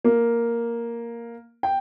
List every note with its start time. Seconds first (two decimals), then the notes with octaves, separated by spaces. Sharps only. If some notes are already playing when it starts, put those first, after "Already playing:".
0.04 A#3
1.63 G5